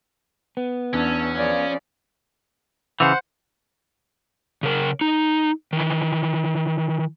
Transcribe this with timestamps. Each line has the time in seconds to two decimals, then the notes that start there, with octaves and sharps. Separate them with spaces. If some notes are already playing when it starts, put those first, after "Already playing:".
0.57 B3
0.94 E2 C#4 D4 E5 A5
1.33 C#3 F3 D5
3.00 C#3 E3 C5 F#5
4.63 C#3 A#4
5.01 D#4
5.73 D#3 E3